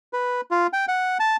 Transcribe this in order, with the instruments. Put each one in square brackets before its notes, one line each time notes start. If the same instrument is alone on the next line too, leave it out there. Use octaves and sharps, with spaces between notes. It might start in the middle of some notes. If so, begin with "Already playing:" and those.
[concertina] B4
F4
G5
F#5
A5